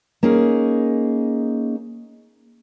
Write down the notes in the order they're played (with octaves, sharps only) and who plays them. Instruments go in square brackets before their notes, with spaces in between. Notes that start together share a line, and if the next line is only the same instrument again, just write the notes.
[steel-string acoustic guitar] A#3 C#4 D#4 G#4